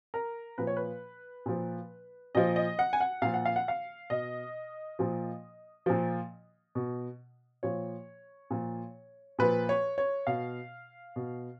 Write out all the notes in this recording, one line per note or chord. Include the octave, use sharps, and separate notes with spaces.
A#4
A#2 F3 B4
C#5
B4
A#2 F3
A#2 F3 D#5
D#5
F#5
G#5
F#5
A#2 F3 F5
F#5
F5
F#5
F5
B2 D#5
A#2 F3
A#2 F3
B2
A#2 F3 C#5
A#2 F3
A#2 F3 B4
C#5
C#5
B2 F5
B2